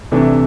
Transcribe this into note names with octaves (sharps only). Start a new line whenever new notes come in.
C2 C3 E3 A3 D4